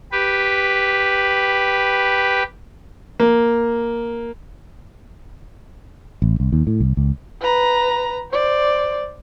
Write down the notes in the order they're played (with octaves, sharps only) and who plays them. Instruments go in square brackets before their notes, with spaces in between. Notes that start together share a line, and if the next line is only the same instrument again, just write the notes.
[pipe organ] G4 B4
[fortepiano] A#3
[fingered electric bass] A1
C2
D#2
A2
C2
C#2
[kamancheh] B4 A#5
C5 D5